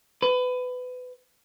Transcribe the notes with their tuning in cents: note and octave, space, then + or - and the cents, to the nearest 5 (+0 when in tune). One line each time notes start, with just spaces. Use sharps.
B4 +25